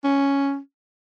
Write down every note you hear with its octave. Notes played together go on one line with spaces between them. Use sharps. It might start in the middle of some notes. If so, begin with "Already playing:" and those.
C#4